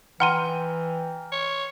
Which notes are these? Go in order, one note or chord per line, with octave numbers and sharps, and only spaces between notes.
E3 F#5 G5 A#5 C6 F6 D#7
C#5